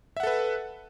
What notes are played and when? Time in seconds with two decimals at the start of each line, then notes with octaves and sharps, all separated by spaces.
0.17 E5
0.20 F#5
0.23 A4
0.27 B4